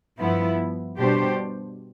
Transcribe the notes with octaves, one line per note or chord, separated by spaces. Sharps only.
G2 F3 B3 E4
B2 G3 D4 G4 C5